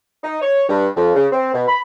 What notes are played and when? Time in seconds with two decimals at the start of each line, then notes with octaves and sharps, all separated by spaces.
0.24 D#4
0.42 C#5
0.69 G2
0.96 F2
1.15 C#3
1.32 C4
1.54 B2
1.68 B5